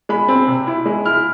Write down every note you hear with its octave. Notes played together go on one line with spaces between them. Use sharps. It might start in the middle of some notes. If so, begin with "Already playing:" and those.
G#3 B5
C4
C3
E4
G#3
E4 F6